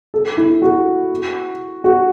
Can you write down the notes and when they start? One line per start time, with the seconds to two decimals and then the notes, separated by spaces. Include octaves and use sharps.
0.14 A4
0.37 E4
0.62 F#4
1.84 F#4